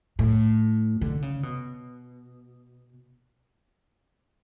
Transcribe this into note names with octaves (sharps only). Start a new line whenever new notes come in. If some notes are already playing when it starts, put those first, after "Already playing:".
A2
D3
C#3
B2